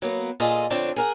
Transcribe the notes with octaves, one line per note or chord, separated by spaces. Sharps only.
F#3 A#3 B3
A#2 F4 G#4 A4 D#5 A5
F2 D3 C4 D4 C#5 A5
G#4 A#4 F#5